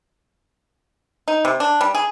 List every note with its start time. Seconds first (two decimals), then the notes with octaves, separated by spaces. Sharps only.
1.28 D#4
1.45 C3
1.60 D4
1.81 G3
1.95 G#4